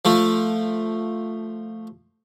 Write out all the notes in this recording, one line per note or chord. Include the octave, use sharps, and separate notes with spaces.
F3 A3